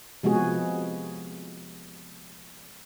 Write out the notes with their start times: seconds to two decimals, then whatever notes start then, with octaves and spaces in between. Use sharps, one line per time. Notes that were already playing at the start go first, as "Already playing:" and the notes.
0.23 C3 F3 G#3 B3 F#4 G#4